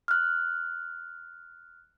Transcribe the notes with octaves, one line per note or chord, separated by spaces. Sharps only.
F6 F#6